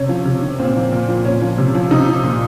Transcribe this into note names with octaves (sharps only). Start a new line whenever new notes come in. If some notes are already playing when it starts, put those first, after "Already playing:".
Already playing: C3 C#4
F3
C3
D#3
A#2 C4
F3
A#2
F3
A#2 C#4
F3
C3
F3
C3 D#4
F3
A#2